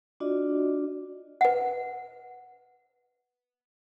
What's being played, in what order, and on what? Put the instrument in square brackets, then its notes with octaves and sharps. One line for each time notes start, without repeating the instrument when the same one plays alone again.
[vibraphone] D4 F4 F#4 D5 D#5
[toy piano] B4 F#5